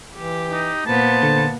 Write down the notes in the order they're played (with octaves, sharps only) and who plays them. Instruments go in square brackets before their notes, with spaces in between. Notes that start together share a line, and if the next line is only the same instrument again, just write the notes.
[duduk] E3 [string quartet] G4
[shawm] D#4
[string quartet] A#2 B3 [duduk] C5 [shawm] A5
[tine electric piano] D3